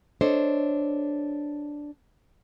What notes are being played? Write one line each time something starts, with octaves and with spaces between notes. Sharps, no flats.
D4 A4 C5 C#5 D#5